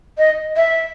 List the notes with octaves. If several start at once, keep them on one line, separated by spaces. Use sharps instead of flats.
D#5
E5